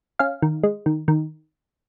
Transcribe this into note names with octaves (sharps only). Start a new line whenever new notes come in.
C#4 F5
D#3
G#3
D#3
D#3